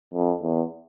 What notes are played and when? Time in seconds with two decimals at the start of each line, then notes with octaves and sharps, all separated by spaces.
0.14 F2
0.42 E2